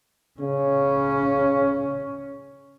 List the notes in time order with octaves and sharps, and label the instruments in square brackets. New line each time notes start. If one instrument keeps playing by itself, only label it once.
[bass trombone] C#3 [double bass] C#4